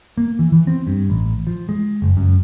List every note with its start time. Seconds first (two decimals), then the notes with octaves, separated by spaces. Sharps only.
0.17 A#3
0.39 E3
0.52 E3
0.67 C4
0.87 G2
1.10 A1
1.47 F3
1.69 G#3
2.02 F#1
2.17 F#2